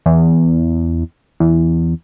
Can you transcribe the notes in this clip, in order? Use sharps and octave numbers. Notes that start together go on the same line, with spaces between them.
E2
E2